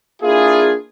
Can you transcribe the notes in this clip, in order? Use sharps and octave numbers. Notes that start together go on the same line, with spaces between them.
A#3 D4 E4 F4 G#4